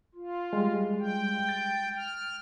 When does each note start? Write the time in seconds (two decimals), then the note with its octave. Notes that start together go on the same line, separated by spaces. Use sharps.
0.15 F4
0.53 G3 G#3
0.99 G5
1.49 A6
1.97 F6